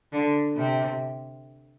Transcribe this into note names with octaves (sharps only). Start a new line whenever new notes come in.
D3
C3